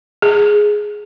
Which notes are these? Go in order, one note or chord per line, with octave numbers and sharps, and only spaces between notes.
G#4